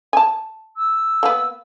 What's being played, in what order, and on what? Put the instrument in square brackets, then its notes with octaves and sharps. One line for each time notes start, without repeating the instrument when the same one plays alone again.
[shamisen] G#5 A5
[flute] E6
[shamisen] A#3 B3